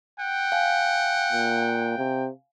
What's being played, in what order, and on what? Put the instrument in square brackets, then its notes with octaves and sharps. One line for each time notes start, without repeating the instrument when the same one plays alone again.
[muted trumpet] F#5 [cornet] G5
[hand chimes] F5 G#5
[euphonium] A#2
C3